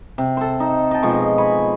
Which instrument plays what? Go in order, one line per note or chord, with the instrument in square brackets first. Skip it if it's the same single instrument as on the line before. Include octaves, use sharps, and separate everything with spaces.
[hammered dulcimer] C3
A4 C5
D#4
D#5 G5 A5
B2 F3 G#3 C#6
G#5 B5 C#6